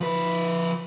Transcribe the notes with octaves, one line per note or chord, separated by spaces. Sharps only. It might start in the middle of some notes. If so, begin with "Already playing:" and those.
F3 B4